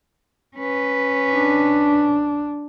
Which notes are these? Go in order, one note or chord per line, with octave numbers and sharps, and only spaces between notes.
C#4 B4
D4